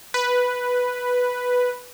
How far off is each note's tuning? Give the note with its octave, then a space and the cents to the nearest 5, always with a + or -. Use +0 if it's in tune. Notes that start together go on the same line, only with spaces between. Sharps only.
B4 +0